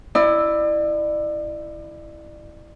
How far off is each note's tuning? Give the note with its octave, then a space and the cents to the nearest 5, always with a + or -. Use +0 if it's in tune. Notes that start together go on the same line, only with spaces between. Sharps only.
E4 +0 D5 +35